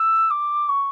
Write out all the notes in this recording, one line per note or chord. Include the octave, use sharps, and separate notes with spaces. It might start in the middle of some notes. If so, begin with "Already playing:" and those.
Already playing: E6
D6
C#6